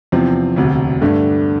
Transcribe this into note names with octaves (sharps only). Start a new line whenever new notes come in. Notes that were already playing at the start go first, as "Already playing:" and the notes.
E2 C3 F3 C4
E1 D2 C3
G2 D3 A3 D4